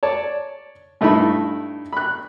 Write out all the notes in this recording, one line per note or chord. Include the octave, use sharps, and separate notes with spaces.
C#5 D5 A5
G2 A3 D#4 E4 E5 B5
B5 F#6